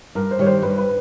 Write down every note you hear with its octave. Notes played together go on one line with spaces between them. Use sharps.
G2 A#4
C5
D#3 G3 C#5
C5
G2 B4
B4